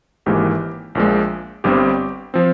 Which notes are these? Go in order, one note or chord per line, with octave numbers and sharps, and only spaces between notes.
G#1 G#2 E3 A#3 G4
A#1 A#2 F3 G#3
G1 G2 G3 C4 G4
F3 C4